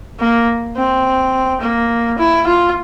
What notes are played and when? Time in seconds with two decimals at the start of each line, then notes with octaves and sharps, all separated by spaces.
0.20 A#3
0.77 C4
1.61 A#3
2.19 E4
2.47 F4